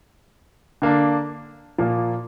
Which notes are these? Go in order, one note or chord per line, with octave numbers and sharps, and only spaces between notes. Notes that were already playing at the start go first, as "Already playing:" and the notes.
D3 A#3 D4
A#2 F3 A#3